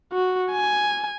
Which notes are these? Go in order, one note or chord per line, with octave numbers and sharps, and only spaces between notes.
F#4
G#5